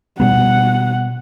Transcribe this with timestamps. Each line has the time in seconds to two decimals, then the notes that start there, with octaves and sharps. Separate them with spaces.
0.20 B2 G3 B3 F#5